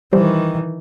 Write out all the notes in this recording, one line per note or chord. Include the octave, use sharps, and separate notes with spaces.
D#3 E3 G3 G4 C5